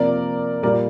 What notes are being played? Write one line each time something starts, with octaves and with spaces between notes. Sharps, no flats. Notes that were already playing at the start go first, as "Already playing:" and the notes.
Already playing: C3 F3 A#3 A#4 D5
A#2 G3 A#3 A#4 D5